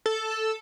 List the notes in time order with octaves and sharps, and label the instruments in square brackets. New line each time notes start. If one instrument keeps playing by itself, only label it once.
[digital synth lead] A4